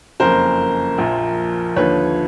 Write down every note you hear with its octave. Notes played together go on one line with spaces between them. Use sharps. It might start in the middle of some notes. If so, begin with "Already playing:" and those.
F#1 F2 C#3 A#4 C5
A#1 A#2 F3
D#2 D3 F3 B4 C#5